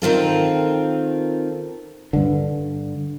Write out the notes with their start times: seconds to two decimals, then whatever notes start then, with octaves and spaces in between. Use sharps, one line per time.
0.02 D#3 C4 F4 A4
2.13 G2 D3